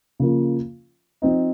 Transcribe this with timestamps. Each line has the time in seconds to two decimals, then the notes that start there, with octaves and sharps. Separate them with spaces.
0.20 C#3 F3 A#3 F4
1.22 F3 C4 D#4